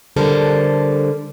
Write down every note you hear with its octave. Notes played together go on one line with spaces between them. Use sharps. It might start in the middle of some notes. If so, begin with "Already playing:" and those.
D3 G3 A4 A#4 C5